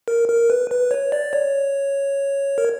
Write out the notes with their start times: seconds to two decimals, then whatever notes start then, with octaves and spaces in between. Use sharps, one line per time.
0.08 A#4
0.29 A#4
0.50 B4
0.71 B4
0.91 C#5
1.12 D5
1.33 C#5
2.58 A#4